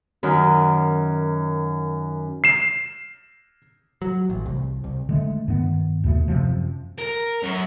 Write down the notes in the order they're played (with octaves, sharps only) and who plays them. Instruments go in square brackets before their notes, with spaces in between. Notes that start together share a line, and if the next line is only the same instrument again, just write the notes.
[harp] F#2 D#3
[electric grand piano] C7 E7
[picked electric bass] F#3
A1
C2
C2
[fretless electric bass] D3 G#3 A3
G2 D#3 B3
D#2 B2 A3
F#2 C3 F3
[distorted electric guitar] A#4
F#2